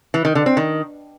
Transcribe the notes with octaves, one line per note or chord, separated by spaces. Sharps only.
E3
D#3
D3
C4
D#3